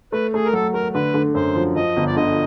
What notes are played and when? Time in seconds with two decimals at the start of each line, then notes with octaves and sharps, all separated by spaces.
0.12 A3 B4
0.33 A3 G#4
0.45 A#4
0.53 F#3 A4
0.74 A3 A#4
0.94 D3 B4
1.14 D3
1.34 F#2 C5
1.55 F3
1.76 F3 D#5
1.96 G1
2.07 D5
2.16 D3 D#5